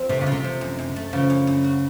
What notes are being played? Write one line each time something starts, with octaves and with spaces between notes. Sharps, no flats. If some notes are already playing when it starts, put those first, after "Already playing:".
Already playing: F3 C4
C3 A3
C#3
F4
C3
F3
F#2
F#2
A3
C#3 F3
F#2
F#2
F#4